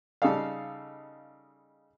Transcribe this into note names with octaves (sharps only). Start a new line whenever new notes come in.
C#3 G3 D#4 A4 F5